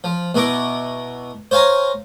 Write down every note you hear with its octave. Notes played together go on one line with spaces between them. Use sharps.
F3
B2 B3 E4 A#5 D6
C5 C#5 F5 G#5 A#5